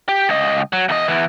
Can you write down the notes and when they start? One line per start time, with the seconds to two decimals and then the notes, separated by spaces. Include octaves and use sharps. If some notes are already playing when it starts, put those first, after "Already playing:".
0.09 G4
0.28 C#2 D#5
0.73 F#3
0.89 E2 D#5
1.08 E2 E3